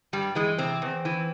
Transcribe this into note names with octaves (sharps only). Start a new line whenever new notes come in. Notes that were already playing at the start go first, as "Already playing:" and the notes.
G2 G3
E3 G#3
C3 C4
E2
E3